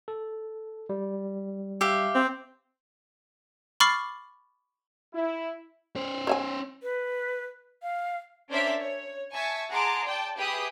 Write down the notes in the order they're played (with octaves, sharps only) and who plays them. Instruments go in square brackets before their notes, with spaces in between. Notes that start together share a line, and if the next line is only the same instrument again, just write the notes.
[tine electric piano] A4
G3
[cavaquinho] G4 E5 F5
[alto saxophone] C4
[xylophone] B5 C#6 D6 F6 A6 C7
[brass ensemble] E4
[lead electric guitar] C#4 C5
[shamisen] C#5 E5 G#5
[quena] B4
F5
[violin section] C#4 D4 A#4 C5 D5 E5
C#5
E5 G#5 A5 C#6
G#4 F#5 A5 A#5 C6 D6
D5 G5 A5
G4 G#4 B4 E5 B5 D#6